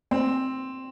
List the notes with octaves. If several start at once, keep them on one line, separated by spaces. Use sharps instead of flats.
C4